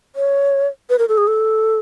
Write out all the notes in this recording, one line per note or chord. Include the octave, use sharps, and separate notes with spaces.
C#5
B4
A#4
A4
G#4
A4